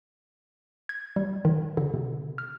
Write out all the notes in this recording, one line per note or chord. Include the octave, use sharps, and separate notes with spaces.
G#6
G3
D#3
D3
C3
F6